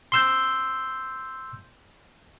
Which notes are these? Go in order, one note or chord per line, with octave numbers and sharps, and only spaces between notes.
C6 E6 G6